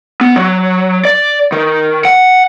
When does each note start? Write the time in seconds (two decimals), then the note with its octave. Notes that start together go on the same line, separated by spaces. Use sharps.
0.21 B3
0.36 F#3
1.05 D5
1.52 D#3
2.05 F#5